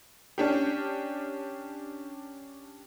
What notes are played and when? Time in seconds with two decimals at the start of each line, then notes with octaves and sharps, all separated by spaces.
0.38 C#4 D4 G4